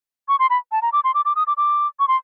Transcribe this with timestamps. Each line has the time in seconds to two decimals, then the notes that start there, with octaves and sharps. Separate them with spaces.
0.28 C#6
0.39 C6
0.50 B5
0.72 A5
0.82 A#5
0.93 D6
1.04 C6
1.14 D6
1.25 D6
1.36 D#6
1.47 D6
1.57 D6
1.99 C#6
2.08 C6